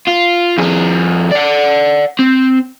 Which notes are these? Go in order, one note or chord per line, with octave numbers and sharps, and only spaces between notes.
F4
F2 G#4
D5 F#5
C4